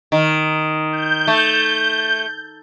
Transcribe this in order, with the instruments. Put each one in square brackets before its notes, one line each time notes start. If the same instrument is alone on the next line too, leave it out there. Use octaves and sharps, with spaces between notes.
[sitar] D#3
[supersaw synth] G6
[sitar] A3